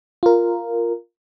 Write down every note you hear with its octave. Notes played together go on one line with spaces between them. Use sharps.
F4 A#4